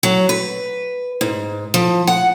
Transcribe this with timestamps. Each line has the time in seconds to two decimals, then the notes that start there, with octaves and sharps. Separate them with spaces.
0.03 F#3
0.29 B4
1.21 G#2
1.74 F3
2.07 F#5